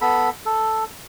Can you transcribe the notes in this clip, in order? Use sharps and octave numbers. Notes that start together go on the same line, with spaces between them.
B3 A4 B5
A4